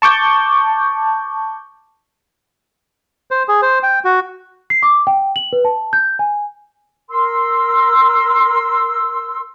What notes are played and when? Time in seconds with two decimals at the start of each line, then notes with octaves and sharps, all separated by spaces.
0.02 A5 C#6 D6 G6
3.31 C5
3.48 G#4
3.62 C5
3.83 G5
4.05 F#4
4.70 C7
4.83 D6
5.07 G5
5.36 F#7
5.53 B4
5.65 A5
5.93 G6
6.19 G#5
7.10 A#4 C6 E6